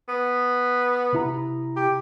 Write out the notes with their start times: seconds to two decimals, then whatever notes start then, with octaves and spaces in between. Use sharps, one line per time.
0.08 B3
1.13 C3 E4 A#5
1.76 G4